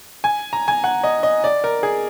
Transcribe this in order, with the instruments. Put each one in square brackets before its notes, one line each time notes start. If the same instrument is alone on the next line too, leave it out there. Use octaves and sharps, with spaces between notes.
[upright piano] G#5
A#5
G#5
F#5
D#5
D#5
D5
A#4
G#4